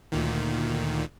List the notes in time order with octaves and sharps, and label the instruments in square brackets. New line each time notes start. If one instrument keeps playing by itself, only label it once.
[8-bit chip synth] D2 A#2 D#3